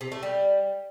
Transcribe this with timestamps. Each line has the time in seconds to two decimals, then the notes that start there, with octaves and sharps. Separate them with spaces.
0.01 C3
0.12 A3
0.23 G3